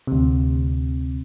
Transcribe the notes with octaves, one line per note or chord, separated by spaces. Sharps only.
D2 C3